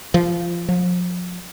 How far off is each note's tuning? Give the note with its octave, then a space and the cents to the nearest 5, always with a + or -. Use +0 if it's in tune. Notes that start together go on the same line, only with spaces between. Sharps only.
F3 -20
F3 +40